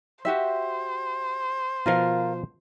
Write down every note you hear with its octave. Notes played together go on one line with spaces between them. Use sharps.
F#4 G4 C5 E5
B2 F3 F4 A#4 F5